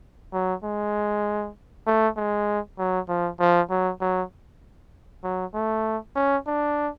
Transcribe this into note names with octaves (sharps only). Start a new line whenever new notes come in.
F#3
G#3
A3
G#3
F#3
F3
F3
F#3
F#3
F#3
A3
C#4
D4